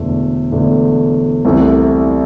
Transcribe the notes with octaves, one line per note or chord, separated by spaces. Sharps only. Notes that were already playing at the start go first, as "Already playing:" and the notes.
Already playing: E1 E2 D3 A3
E1 E2 D3 A3
C2 C3 E3 A3